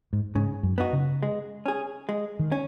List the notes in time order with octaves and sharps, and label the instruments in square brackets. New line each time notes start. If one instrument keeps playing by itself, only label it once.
[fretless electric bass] G#2
[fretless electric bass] G#2 [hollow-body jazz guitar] C#3
[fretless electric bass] F#2
[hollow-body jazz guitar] B3 D#4 F#4
[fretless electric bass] C#3
[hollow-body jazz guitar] G#3
C#4 G#4
G#3
[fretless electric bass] D#3
[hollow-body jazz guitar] C#4